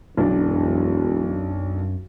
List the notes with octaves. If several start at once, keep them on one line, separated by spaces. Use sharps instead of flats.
E1 B1 F#2 D4